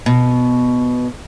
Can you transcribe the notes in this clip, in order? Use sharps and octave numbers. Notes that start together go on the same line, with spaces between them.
B2